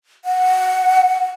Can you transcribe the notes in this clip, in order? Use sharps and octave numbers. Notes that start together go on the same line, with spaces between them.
F#5